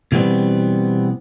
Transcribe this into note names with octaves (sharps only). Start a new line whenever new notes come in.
B2 E3 G3 B3 C4